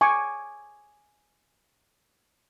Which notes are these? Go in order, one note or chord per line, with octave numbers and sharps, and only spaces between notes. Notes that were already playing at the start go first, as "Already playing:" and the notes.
G#5 C#6 D6